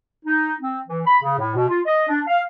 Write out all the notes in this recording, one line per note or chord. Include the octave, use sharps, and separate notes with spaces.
D#4
C4
E3
B5
C#3
A2
B2
F4
D#5
D4
F5